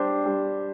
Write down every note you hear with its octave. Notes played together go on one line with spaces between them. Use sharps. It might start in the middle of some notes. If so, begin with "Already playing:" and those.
Already playing: G3 D4 G4 C5
G3